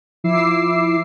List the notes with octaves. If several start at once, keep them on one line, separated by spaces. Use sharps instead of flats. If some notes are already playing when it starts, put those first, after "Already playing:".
F3 E4 D6 E6 C7